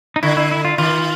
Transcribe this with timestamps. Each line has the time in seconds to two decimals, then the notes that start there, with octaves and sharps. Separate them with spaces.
0.16 D#4
0.23 D3 E4
0.37 E4
0.51 E4
0.65 F4
0.78 D#3 F4